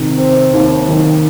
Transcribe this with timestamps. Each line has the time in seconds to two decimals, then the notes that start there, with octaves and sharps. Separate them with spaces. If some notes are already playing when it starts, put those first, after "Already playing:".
Already playing: C3 D#3
0.17 C4
0.53 D#2
0.88 D#3